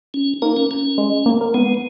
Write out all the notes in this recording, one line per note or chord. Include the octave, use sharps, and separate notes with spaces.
C#4
A#3 D#4
C#4
C#4
G#3
A#3
A#3
G#3 B3